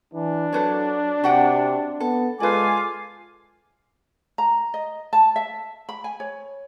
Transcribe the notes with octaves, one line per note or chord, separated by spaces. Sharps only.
E3 D4
F#3 A4 B4 C#5
C3 F#4 F#5 G5
B3 A4
G#3 F4 A4 B4 D5 G#5 D6
A#5
D#5
A5
E5
B5
G#5
C#5